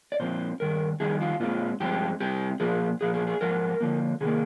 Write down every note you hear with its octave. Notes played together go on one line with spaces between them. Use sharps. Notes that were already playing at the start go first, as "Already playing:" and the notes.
D5
A#2 F3 C4 C5
G2 D#3 A#4
F2 D#3 G3 G#4
F4
A#2 G#3 C4 F4
G2 F3 G#3 C4 G4
C3 G3 C4 G4
A#2 F3 G#4
A#2 F3 G#4
G#4
G#4
G#2 F3 A#4
D3 F3 A#3
C3 D#3 A#3 G#4